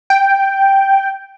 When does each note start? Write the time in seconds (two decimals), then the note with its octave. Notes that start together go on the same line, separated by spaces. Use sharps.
0.10 G5